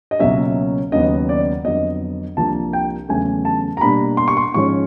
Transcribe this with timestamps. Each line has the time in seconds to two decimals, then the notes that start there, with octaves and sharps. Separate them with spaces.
0.11 D#5
0.19 C#2 B2 F#3 A#3 C#4 E5
0.92 D#2 C#3 F#3 B3 D#5
1.29 D5
1.64 F2 D3 F#3 B3 D#5
2.37 C2 C3 F3 A#3 D4 A5
2.73 G5
3.09 E2 C#3 F#3 A3 G#5
3.45 A5
3.77 A#5
3.81 B2 G3 A#3 D4 B5
4.17 C6
4.28 C#6
4.37 C6
4.54 G#2 F3 G#3 C#4 C#6